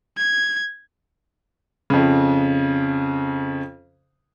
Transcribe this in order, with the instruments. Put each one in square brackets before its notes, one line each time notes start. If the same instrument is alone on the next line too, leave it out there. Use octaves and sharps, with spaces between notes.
[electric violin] G#6
[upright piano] F2 C#3